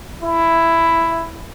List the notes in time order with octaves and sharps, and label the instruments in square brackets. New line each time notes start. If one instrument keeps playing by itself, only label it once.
[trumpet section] E4